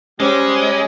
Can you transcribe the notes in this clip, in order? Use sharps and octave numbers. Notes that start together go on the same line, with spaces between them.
G3 G#3 C#4 C5